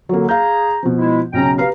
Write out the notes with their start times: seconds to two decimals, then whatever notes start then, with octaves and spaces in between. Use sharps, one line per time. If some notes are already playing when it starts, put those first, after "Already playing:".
0.09 D3 F#3 A#3
0.29 G#4 F5 A#5 G6
0.83 B2 F3
0.97 G#3 E4
1.33 B1 C#3 C#4 G5 A#5
1.58 G4 B4 F5 A#5